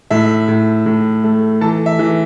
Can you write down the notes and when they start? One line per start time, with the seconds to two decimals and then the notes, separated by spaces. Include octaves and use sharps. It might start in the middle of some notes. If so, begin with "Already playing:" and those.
0.10 A2 E5
0.48 A2
0.86 A2
1.24 A3
1.61 E3 A4 A5
1.86 E5
1.99 E3